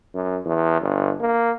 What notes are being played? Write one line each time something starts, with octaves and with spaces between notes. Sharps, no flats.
F#2
E2
G1
A#3